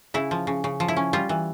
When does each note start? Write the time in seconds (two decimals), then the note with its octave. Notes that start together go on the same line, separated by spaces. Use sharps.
0.14 C#3 E4
0.31 F3
0.47 C#3
0.64 C#3
0.80 F3
0.88 E4
0.96 C#4
1.13 G3 F4
1.29 E3